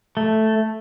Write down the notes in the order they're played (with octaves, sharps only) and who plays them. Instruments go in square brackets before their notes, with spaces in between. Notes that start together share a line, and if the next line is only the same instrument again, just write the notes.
[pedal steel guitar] A3